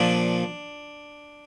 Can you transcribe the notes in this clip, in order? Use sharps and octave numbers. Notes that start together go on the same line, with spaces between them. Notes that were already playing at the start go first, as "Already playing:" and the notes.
Already playing: A#2 F3 D4